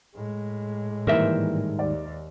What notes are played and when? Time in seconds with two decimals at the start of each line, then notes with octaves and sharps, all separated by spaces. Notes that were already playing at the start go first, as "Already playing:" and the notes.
0.16 A2 G#3
1.07 G#2 D#3 E3 G3 A#3 A#4 C5 E5
1.79 D#2 D5